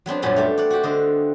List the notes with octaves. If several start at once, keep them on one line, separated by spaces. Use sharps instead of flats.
F#3 B3 C4 D4
F#2 A#2 F#3 G3 B3 C#4
A3 C4 G4
D5 F#5
F#4 G4
D3 C4 D#5